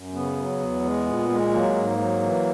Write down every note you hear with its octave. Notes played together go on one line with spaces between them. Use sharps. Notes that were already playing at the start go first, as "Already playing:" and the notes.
Already playing: F#2
C#3 B3
F#3
E2
G#3
A#2
G#3
F#3 A#3
G#2
F#3
E3